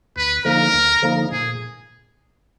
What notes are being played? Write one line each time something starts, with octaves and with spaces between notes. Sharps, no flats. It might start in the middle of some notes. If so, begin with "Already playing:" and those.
D2 B4
D3 F3 A#3 D#4 A#4
D2
D3 F3 A#3 D#4
A#2 G#4